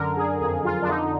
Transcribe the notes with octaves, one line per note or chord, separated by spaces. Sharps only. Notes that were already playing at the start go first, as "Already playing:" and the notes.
Already playing: F#2 D3 A#4
G#4
F2 G#4
F4
D4
D3 D#4